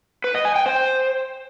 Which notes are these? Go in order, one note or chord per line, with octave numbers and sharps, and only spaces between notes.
B4
D#5
G#5
G5
C5